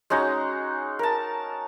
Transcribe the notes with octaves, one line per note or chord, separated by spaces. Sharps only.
G#3 C#4 D#4 F#4
A#4 A5